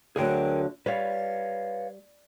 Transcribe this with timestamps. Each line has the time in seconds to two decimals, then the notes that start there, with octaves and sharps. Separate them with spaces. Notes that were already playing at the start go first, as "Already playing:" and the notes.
0.16 D2 D3 F#3 G#4 A#4 G5
0.86 G3 B4 C#5 F5